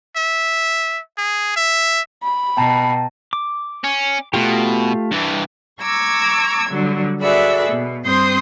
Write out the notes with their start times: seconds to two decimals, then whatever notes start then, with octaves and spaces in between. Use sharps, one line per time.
0.17 E5
1.18 G#4
1.56 E5
2.23 B5
2.57 B2 G5 A5 A#5
3.33 D6
3.84 C#4
4.34 B2 A3 F4 G4
5.11 G2 E3
5.81 A#5 C#6 D6 E6 G#6
6.69 D3 F#3 G3
7.20 F#4 G#4 A4 B4 D5 E5
7.69 B2
8.05 G2 C4 C5 C6 D#6 G6